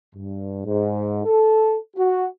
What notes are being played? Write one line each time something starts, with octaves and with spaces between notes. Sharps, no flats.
G2
G#2
A4
F#4